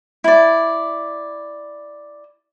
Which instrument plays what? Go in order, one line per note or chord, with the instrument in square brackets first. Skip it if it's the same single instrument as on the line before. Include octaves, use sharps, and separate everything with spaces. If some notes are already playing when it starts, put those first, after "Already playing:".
[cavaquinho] E4 D5